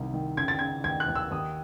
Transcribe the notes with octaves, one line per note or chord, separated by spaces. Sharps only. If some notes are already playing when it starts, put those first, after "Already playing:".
Already playing: C2 C3 D#3
D#3
C#3 G#6
A6
C#3 G#6
D#2 G#6
F#6
D#2
E6
D#2 D#6